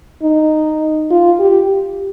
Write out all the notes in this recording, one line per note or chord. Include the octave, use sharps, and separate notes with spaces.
D#4
F4
G4